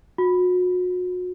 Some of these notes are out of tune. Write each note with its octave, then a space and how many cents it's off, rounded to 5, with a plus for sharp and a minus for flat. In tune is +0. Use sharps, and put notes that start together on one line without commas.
F#4 -35